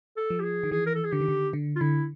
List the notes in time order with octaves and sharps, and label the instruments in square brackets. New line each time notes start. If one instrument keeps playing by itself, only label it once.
[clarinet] A4
[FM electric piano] F3
[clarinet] G4
G#4
[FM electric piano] D#3
[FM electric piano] E3 [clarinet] G#4
[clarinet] A#4
A4
G#4
[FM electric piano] D3 [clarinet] G4
[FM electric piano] D#3
D3
D3
[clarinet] F4
[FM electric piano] D3 [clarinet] E4